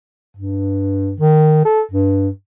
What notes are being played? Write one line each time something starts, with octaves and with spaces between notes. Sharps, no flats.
G2
D#3
A4
G2